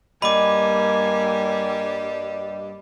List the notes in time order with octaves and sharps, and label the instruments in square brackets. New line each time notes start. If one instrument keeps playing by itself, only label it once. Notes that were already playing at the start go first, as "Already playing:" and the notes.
[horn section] G2 G3 [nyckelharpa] A#3 G#5 [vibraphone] D#5 [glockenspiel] B5 D6